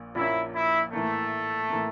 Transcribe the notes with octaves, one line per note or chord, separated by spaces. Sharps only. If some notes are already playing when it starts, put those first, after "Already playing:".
Already playing: A#1 A#2 A#3
A#1 A#2 F3 A#3 C#4 E4
E4
A2 E3 A3 A#3
A2 E3 A#3